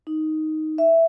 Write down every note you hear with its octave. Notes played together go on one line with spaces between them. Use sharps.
D#4
E5